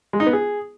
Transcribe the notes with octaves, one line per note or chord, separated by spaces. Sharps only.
G#3
D#4
B3
G#4